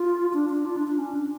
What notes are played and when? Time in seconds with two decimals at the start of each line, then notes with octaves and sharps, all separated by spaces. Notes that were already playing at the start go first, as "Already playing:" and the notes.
Already playing: F4
0.33 D4
0.50 D4
0.66 F4
0.76 D4
0.88 D4
0.98 C#4
1.14 D4